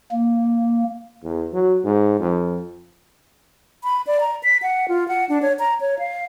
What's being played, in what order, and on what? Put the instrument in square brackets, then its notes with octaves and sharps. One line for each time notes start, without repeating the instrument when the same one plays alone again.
[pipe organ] A#3
[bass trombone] E2
F#3
G#2
F2
[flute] B5
D5
A#5
B6
F#5
F4
F#5
D4
C#5
A#5
C#5
F5